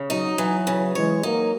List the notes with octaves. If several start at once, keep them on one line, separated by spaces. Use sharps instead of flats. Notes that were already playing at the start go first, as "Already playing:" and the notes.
Already playing: C#3
F#3 D#4
E3 F#3
C#3
E3 G#3 C#5
F#3 A#3 D#4